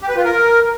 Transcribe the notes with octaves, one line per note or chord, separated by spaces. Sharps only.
G4
B4
F4
A#4